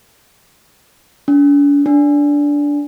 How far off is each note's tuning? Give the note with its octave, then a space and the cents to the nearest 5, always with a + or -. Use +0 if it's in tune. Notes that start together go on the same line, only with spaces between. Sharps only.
D4 -45
D4 -15